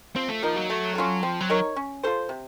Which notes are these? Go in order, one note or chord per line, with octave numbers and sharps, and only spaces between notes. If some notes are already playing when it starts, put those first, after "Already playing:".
F3 C4
A3
F3 A#3 D#4
F#3
A3
C#4 F4 A4
F3 C4
F#3
D#4 A#4 C#5
C#4
F4 A4 C5
C3